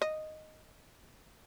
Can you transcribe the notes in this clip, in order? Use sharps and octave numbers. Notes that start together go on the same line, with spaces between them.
D#5